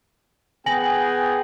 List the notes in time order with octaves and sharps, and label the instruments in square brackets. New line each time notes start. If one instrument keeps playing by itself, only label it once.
[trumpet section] B3 G#4 G5 [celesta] G#5 A#6 F#7